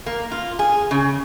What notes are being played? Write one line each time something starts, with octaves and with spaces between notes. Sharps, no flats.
A#3
F4
G#4
C#3